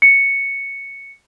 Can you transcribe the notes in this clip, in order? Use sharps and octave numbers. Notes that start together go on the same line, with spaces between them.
C#7